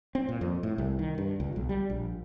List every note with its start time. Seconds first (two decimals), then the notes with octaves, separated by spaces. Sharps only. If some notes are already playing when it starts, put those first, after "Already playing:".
0.15 C4
0.29 A#2
0.41 F2
0.63 A2
0.78 C2
0.99 D#3
1.18 G2
1.40 C#2
1.56 B1
1.69 G3
1.90 A#1